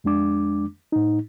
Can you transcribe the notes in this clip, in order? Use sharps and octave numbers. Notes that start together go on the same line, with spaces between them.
F2 G#3 D4 D6
A2 D#4